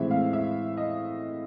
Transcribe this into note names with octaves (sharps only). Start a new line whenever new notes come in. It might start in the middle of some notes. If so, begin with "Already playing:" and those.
Already playing: A2 E3 G#3 C4 E5
F5
E5
D#5